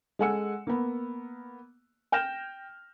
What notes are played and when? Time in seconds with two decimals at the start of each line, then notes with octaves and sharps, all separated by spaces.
0.19 G#3 A4 F#5 G#5 E6 C#7
0.67 A#3 B3
2.12 G5 F6 G6 A#6 E7